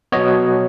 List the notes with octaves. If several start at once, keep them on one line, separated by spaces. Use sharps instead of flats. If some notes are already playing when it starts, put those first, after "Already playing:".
B2 F#3 B3 C#5 D#5